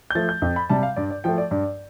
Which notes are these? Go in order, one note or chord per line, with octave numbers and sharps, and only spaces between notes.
G6
F3 A3 A6
G6
F2
B5
C3 G3 A5
F5
G2 D5
D5
F3 A3 G5
D5
G2 D5